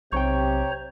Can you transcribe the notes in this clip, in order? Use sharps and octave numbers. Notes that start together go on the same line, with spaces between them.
B1 C3 G4 C5 C#5 G5 A#5 C#6